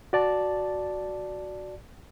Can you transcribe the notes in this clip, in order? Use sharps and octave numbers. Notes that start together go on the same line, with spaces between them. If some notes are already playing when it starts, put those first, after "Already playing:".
F#4 D5 A5